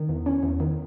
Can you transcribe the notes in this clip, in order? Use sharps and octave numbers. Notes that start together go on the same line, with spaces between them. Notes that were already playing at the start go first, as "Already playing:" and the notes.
Already playing: D#3
E2
C#4
E2
D#3